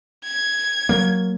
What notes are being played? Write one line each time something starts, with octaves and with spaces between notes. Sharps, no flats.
G#6
F#3 A#3